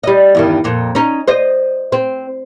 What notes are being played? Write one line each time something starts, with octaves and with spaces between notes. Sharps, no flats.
G3 D#5
E2 G2 D#3
F2 A#2
C#4 D#4
C5 D#5
C4